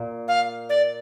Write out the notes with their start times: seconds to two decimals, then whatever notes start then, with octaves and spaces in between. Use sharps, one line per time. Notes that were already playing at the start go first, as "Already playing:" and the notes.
Already playing: A#2
0.28 F5
0.69 D5